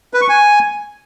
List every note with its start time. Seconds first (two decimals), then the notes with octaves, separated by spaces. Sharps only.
0.14 B4
0.21 C#6
0.29 G#5